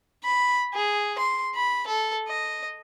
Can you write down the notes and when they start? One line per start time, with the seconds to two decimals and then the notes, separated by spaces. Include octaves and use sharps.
0.24 B5
0.74 G#4
1.18 C6
1.55 B5
1.87 A4
2.28 D#5